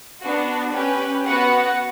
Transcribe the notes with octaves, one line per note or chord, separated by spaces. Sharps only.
B3 D4 F#4
C#4 G4 B4
B3 F#4 B4 F#5